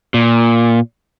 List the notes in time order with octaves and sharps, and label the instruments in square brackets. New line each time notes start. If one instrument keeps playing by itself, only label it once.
[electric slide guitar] A#2